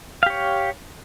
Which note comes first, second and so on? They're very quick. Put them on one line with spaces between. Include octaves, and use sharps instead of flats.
F5 G4 C#5